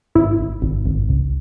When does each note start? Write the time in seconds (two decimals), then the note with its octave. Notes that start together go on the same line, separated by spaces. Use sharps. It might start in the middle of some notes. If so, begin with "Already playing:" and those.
0.15 G#1 E4
0.39 G#1
0.62 G#1
0.86 G#1
1.09 C#2